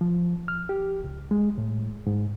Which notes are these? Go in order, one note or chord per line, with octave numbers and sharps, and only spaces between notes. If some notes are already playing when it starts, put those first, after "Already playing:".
F3
F6
G4
C#2
G#3
A2
G#2